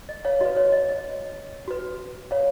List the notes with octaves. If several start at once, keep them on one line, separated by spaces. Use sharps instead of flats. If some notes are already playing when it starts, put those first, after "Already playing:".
D#5
C#5 F5
F#4 B4 D#5
C#5
D#5
D#5
F#4 B4
C#5 F5